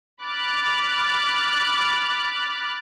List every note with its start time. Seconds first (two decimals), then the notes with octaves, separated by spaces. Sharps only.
0.22 B5 D6 F6 F#6 A6